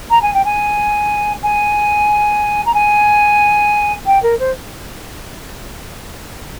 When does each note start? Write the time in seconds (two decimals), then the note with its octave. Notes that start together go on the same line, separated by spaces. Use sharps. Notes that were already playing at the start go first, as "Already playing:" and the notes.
0.10 A#5
0.22 G#5
0.34 G5
0.45 G#5
1.43 G#5
2.66 A#5
2.74 G#5
4.06 G5
4.22 A#4
4.39 C5